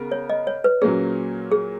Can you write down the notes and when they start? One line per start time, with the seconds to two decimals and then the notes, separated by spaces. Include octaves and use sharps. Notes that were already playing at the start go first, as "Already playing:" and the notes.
Already playing: C#3 B3 A#4
0.12 C#5
0.29 D#5
0.47 C#5
0.64 B4
0.82 A#2 F#3 A#3 C#4 G#4
1.52 G#4